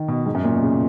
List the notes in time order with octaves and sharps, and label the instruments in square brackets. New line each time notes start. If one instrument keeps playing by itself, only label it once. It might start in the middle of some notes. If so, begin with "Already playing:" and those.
Already playing: [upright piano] D#3
B2
G#2
F#2
A#2
B2
C#3